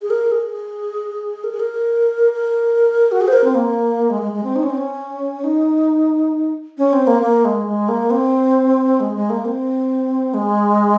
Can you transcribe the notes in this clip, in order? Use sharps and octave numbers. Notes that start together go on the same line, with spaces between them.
G#4
A#4
G#4
A#4
G#4
A#4
A#4
F#4
G#4
C5
A#4
C4
A#3
G#3
G#3
G#3
C4
D#4
C#4
C4
C#4
D#4
C#4
C4
A#3
A#3
G#3
G#3
A#3
C4
G#3
G#3
A#3
C4
G#3